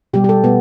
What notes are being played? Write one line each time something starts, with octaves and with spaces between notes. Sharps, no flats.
B2 G3 G4
G4
A4
B2 A3 B3